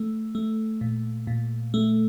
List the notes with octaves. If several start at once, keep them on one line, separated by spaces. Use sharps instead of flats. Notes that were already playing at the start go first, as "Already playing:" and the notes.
Already playing: A3
A3
A#2
A#2
A3